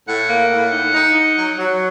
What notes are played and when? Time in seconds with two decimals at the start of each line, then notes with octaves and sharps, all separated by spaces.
0.07 A2 F#5
0.29 A#3
0.51 A2
0.73 D#4
0.94 D#4
1.15 D#4
1.37 F#3
1.59 F#3